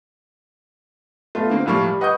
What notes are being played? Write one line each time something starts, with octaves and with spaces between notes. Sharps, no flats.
A3 B3 F4
D3 A#3 C4
A2 F3 G3 A#3 C#6 F6
G3
B4 D#5 F#5 C#6 D#6 G6